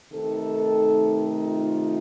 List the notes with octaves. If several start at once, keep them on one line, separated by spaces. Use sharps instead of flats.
C3 D#3 A3 D#4 A4
F4